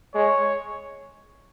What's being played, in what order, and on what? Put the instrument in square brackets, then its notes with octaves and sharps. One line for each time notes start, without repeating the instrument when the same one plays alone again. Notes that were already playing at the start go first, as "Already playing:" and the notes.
[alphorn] G#3 [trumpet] C#5